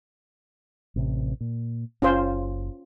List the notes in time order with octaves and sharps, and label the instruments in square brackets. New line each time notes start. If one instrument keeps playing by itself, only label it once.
[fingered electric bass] A1 C3
A#2
[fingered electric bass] F#1 [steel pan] C#4 F4 C5